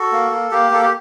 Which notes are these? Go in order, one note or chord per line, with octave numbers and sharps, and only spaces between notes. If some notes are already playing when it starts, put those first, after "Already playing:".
Already playing: F#4 A4
A#3
A#3
A#3 G4
A#3 A4
G4